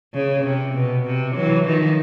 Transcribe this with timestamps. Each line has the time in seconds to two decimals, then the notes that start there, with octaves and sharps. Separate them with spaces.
0.14 C#3
0.44 C3
0.74 B2
1.05 C3
1.35 E3 F#3
1.66 D#3 F3